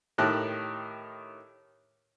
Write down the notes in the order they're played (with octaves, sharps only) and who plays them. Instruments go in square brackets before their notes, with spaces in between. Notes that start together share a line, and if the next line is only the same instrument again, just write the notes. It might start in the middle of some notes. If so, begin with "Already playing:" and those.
[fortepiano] A2 D#3 G4 A#4 A5 F#6